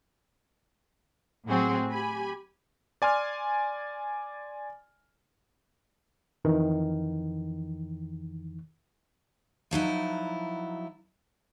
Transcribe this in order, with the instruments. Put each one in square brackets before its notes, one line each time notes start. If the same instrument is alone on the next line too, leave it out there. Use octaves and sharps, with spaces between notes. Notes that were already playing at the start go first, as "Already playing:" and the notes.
[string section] A2 F#3 C4 F#4 G#4
G4 G#5 B5
[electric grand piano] D5 G#5 C6 F6
[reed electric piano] F2 D#3 E3
[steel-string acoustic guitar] F3 F#3 D#4 E4